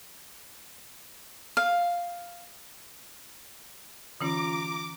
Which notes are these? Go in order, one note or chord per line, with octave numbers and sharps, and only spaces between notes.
F5
D3 E3 C#4 F4 A#5 D6